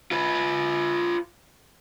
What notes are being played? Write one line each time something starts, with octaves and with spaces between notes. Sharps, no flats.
F4 B4